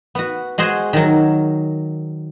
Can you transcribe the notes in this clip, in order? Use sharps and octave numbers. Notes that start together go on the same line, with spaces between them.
B3 F#4
G#3 F#4 G#4 C5
D#3 F#3